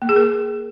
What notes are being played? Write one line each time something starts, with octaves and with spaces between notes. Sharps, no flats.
A#3
G#4
A#4